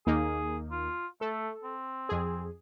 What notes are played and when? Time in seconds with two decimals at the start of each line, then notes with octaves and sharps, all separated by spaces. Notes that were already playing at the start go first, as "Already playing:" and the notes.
0.07 D#2 A#3 D#4 G#4
0.71 F4
1.21 A3 A4
1.64 C4
2.09 F2 G#4